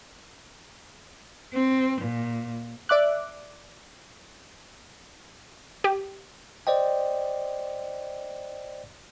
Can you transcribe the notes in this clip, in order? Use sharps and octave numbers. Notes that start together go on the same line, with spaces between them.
C4
A#2
D5 E5 D6 F#6
G4
C5 D5 D#5 G5